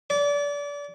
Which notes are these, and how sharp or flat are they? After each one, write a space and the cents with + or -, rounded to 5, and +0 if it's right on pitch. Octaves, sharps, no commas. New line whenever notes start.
D5 -30